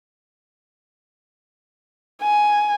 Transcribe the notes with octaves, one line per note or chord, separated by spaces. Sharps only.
G#5